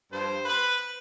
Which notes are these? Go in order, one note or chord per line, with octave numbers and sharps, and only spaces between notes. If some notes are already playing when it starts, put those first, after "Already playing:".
G2 F3 C5
B4